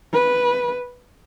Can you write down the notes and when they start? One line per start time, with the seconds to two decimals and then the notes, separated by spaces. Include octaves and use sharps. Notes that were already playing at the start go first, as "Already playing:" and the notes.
0.13 B4